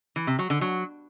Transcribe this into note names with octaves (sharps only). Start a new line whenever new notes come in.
E3
C3
F#3
D3
F#3